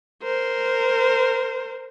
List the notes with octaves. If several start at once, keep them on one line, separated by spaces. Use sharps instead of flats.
A#4 C5